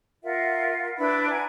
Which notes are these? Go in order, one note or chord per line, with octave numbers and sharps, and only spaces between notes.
F4 A#4 E5 F#5
D4 E4 B4 B5
F#5 G#5 A#5